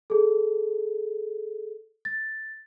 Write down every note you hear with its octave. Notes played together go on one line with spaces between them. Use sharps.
G#4 A4
A6